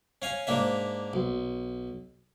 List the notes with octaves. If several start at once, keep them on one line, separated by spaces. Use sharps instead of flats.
C#4 F5 G#5
G#2 A#3 D4 E5
B1